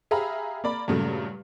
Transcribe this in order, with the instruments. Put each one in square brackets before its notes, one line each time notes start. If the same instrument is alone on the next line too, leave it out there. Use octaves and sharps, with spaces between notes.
[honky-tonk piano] G4 G#4 E5 F5 A#5 B5
A#3 D5 B5
G2 A#2 C#3 F#3 A3